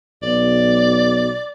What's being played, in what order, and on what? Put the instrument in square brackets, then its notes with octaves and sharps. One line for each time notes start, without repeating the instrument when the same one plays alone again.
[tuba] B1 [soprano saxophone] D5